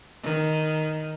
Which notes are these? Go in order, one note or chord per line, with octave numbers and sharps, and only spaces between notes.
D#3